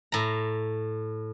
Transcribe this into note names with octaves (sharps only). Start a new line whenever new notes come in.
A2 A#5